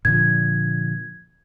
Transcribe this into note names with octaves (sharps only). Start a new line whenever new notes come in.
A#2 D3 F3 G#6